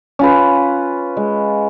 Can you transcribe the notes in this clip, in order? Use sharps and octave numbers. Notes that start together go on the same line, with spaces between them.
C#4 F4 B4
G#3